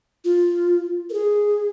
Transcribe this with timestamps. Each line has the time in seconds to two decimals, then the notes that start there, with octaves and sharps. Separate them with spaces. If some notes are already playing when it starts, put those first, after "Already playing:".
0.25 F4
1.10 A#4
1.13 G#4